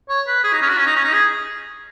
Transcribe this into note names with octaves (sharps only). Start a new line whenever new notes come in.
C#5
B4
G#4
D#4
C#4
F#4
C#4
D#4
C#4
D#4
G#4